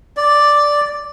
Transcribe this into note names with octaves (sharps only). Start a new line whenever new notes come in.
D5